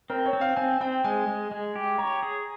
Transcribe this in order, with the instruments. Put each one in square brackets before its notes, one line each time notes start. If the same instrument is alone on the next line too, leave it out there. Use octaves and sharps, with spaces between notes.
[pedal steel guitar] C4 [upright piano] A#4
[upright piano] C#5
[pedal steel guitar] C4
[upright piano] F5
[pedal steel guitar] C4 [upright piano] G#5
[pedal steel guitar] C4 [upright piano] G5
[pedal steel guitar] G#3 [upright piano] G#5
[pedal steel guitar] G#3
G#3
G4
[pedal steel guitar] C#5 [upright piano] A#5
[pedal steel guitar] G#4